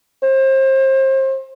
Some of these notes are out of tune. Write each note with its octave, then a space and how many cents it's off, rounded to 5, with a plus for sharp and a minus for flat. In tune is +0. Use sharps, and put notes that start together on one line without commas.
C5 +30